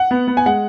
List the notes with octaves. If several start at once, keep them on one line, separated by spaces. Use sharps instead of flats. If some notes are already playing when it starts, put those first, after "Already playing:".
Already playing: F#5
B3
B3
G#5
G#3 F#5